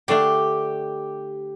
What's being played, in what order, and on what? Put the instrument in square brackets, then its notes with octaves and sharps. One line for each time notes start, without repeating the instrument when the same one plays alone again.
[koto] D3 A3 D4 [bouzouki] G4